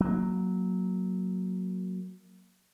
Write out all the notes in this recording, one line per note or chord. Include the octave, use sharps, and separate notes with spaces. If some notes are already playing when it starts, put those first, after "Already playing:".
F#3 A#3